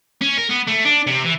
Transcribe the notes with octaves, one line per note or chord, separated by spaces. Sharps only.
C#4
A#4
B3
A3
D4
C3
E3